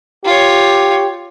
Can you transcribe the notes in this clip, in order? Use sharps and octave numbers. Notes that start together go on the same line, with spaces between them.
F4 G4 C#5